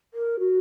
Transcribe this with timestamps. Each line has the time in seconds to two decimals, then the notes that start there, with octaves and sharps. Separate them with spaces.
0.14 A#4
0.39 F#4